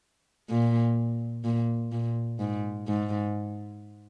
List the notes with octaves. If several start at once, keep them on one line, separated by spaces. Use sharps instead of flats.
A#2
A#2
A#2
G#2
G#2